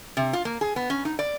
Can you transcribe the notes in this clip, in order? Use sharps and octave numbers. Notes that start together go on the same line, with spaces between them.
C3
F4
A#3
G#4
B3
C#4
D#4
D5